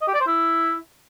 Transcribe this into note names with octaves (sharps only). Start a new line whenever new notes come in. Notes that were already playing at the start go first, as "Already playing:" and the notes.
D#5
G4
D5
C5
E4